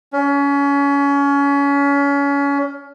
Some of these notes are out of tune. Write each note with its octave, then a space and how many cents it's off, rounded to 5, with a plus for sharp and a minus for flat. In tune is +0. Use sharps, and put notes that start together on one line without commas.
C#4 +30